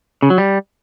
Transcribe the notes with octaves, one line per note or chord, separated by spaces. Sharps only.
C#3
F#3
G3